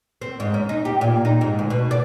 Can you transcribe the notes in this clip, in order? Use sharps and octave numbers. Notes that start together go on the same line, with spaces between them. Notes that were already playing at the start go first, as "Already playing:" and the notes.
C4
G#2
C#4
D#4
G4
A#2
D#4
G#2
D2
B2
D5